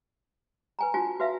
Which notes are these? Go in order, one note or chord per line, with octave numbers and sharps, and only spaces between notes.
B4 G#5 A#5
D4 F4 F#4 G#5 A5
F#4 B4 E5 F5